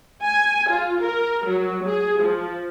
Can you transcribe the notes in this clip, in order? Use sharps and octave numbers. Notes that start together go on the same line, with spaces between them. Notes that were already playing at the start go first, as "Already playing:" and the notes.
G#5
F4
A#4
F#3
G#4
F3